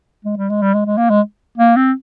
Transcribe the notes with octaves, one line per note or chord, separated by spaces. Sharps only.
G#3
G3
G#3
G3
G#3
G#3
A#3
G#3
A#3
C4